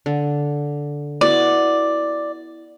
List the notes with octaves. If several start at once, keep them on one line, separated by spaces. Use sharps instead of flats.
D3
B3 E4 F#4 D5